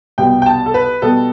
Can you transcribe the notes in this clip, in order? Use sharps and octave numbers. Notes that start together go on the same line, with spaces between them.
C2 B2 G3 B3 G5
G5
A5
A4
B4
B2 G3 B3 A4